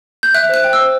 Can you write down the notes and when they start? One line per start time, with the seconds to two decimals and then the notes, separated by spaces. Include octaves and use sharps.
0.23 G6
0.34 E5 F#6
0.49 C5 F#6
0.64 G5
0.73 E6
0.79 C5